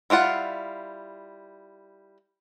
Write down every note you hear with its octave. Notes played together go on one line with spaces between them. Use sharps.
G3 E4 F4 F#5